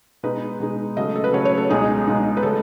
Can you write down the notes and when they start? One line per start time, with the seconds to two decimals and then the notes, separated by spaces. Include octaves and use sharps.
0.23 B2 G#3 D#4 B4
0.60 B2 G#3 D#4
0.97 C#3 F#3 A3 D#5
1.16 A4
1.24 B4
1.33 C#3 F#3 A3 C#5
1.45 C#5
1.58 A4
1.70 C#2 B2 G#3 D#4 G#4
2.07 C#2 B2 G#3 D#4
2.37 B4
2.43 C#3 F#3 A3 A4